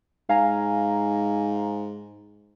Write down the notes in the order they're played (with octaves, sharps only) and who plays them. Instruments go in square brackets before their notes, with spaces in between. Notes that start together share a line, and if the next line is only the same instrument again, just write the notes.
[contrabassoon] G#2 [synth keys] F5 G#5 A#5